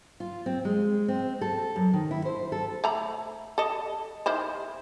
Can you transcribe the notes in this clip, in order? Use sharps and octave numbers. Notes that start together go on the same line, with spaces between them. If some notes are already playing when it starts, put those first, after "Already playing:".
F4
C4
G#3
C4
A4
F#2
D#3
E4
C5
A4
A3 A#5 B5
A4 D#5
D#3 E4 C5